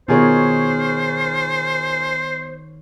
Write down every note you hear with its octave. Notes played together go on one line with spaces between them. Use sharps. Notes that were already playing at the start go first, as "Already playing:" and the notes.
B2 D#3 F4 G#4 A#4 C5 C#5